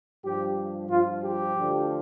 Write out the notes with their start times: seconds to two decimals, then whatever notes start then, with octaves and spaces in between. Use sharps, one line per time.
0.24 G2 F3 G4
0.90 G2 F3 F4
1.23 G4
1.55 D2 D3 F3